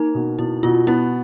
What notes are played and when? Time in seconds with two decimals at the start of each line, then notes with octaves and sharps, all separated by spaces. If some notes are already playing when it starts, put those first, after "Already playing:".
Already playing: A#3 D#4
0.15 B2
0.39 B2 E4
0.63 B2 F4
0.87 B3 E4